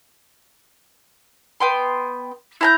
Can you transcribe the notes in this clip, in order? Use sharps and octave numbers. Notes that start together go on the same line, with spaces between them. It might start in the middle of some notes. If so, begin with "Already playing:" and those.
B3 G5 C6
E4 A#5 G6